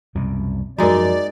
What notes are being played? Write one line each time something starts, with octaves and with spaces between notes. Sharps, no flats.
C2 F#2 B2
F#2 F3 G#3 D#4 F#4 A#4 D5